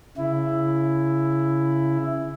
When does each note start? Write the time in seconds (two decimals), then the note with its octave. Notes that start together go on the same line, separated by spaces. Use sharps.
0.17 C#3 E4